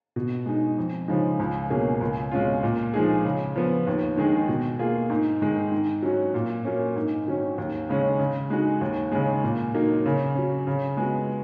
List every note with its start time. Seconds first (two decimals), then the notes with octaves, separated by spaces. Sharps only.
0.16 B2
0.46 G#3 D#4
0.78 F2
1.08 C#3 F3 G#3 D#4
1.39 C#2
1.70 B2 A#3 C#4 G#4
2.01 C#2
2.31 B2 G#3 C#4 F4
2.63 A#2
2.94 F3 G#3 D#4 G#4
3.25 C#3
3.56 F3 B3
3.87 D#2
4.17 D#3 G#3 D#4 G#4
4.48 B2
4.79 A#3 F4 G#4
5.10 G#2
5.42 D#3 G#3
5.72 G#2
6.03 F#3 C#4 F#4
6.34 A#2
6.65 F#3 A#3 C#4
6.96 G#2
7.26 D#3 F#3 C#4
7.58 D#2
7.89 C#3 G#3 C#4
8.19 C#3
8.50 G#3 D#4 F#4
8.81 D#2
9.12 C#3 G#3
9.44 A#2
9.74 F#3 A#3 D#4
10.06 C#3
10.35 F#3 C#4
10.67 C#3
10.97 G#3 B3 F#4